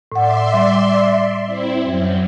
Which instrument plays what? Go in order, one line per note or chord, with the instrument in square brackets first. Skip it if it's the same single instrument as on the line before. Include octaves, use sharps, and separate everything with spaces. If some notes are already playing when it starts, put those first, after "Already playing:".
[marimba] A2 F#5 [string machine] D5 E5 C6
[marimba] G3
[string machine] C4 E4
F#2 F#3